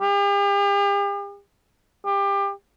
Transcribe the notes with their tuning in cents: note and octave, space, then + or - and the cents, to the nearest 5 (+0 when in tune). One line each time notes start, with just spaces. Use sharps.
G4 +45
G4 +25